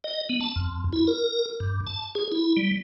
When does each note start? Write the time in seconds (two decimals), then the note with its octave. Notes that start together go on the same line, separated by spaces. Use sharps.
0.04 D#5
0.29 B3
0.41 A5
0.56 F2
0.93 E4
1.07 A#4
1.60 G2
1.87 A5
2.15 G#4
2.32 E4
2.57 G3